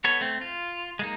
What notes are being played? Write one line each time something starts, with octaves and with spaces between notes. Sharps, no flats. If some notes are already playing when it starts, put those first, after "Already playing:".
B3 A4 C#5
A3 C4
F4
G#3 A#3 D#4